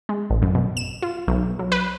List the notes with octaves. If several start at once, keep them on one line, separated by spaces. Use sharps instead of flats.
G#3
A1
F#2
B2
E7
F4
B1
F#3
B4